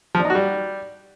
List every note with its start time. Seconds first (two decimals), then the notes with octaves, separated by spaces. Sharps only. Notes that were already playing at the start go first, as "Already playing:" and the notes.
0.15 F3
0.20 D4
0.25 D#4
0.30 F#4
0.35 G3